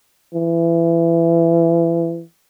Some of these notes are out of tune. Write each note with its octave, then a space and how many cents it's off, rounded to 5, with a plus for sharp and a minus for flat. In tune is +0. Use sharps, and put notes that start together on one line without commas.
E3 +25